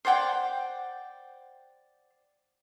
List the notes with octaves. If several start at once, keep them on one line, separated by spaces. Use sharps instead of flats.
C5 D5 F#5 G5